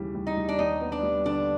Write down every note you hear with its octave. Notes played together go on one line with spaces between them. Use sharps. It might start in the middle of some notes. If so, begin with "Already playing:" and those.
Already playing: D#2 C#3 E3 G3
G3
D#4
G3
D4
D#2 D#4
B3
D4
G3
D3 D4